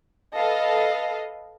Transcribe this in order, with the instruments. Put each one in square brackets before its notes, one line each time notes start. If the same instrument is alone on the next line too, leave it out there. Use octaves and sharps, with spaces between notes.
[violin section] A4 B4 D#5 F5